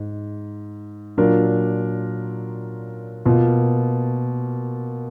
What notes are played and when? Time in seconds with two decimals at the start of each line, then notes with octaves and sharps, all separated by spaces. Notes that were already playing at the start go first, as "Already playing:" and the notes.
Already playing: G#2
1.17 A#2 F#3 D4 F4 A#4
3.25 B2 A#3 F4